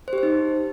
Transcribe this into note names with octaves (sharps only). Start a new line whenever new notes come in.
C5
G4
C5
D#4